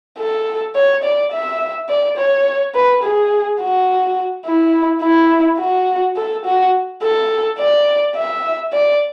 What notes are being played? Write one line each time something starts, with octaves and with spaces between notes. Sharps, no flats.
A4
C#5
D5
E5
D5
C#5
B4
G#4
F#4
E4
E4
F#4
A4
F#4
A4
D5
E5
D5